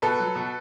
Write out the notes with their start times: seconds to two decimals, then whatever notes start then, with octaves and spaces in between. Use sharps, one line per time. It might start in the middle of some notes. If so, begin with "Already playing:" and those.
0.02 B2 A4 B4
0.20 F#3
0.35 B2